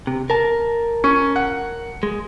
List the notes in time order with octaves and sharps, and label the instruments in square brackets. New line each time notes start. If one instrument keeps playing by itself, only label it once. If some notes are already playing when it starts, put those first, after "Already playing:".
[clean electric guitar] C3
A#4 A5
[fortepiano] C#4
F#5
[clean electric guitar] G#3